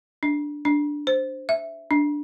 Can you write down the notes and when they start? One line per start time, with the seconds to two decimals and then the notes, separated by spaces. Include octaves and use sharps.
0.23 D4
0.65 D4
1.07 C5
1.49 E5
1.91 D4